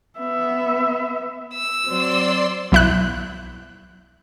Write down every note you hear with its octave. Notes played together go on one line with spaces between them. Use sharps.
B3 E5
E6
F#3 C4 D5 C6
B1 E4 F#6